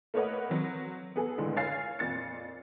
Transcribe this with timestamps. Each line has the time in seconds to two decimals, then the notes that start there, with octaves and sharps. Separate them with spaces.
0.14 A3 A#3 B4 C#5 D#5 F#5
0.49 F#3 C4
1.16 B3 G#4 A4
1.38 C#2 A2 D3 G#3
1.56 C#5 F5 G#5 A6 C7
1.99 F2 A#2 A6 C#7